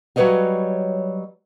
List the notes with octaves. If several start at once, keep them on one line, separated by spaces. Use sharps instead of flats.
F#3 G3 B4 C#5 D#5 F5